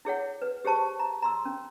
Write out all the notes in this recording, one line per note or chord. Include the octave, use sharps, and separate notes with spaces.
E4 G#4 C#5 F#5
B4
G4 G#4 C5 A5 C#6
A#5
A#5 C6 E6
C#4